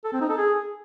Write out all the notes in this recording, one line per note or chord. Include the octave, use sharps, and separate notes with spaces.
A4
C4
D#4
A4
G#4